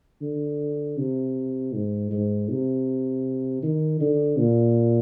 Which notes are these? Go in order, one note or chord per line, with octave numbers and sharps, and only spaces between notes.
D3
C3
G#2
G#2
C3
D#3
D3
A#2